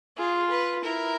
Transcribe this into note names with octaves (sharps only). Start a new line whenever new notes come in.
F4 G#4
B4
E4 A#4